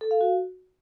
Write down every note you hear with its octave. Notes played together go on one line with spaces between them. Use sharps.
A4
F5
F#4